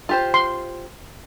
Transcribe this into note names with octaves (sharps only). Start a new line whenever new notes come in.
F4 G4 C5
C6